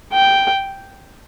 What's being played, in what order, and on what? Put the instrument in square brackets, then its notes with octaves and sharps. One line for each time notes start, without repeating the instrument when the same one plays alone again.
[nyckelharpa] G5